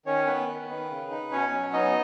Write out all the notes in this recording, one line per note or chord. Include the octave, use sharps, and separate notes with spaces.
D#3 C#4 C#5
B3 B4
D#3
D#3
C#3
D#4
B2 C#4 C#5
F#3
B3 D#4 D#5